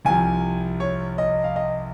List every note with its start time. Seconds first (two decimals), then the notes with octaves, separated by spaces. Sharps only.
0.05 C2 C3 F3 G#5
0.80 C#5
1.18 D#5
1.44 F5
1.56 D#5